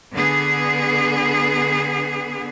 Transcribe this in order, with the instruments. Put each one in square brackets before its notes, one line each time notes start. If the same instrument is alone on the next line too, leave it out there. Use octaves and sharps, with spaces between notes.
[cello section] D3 B3 G#4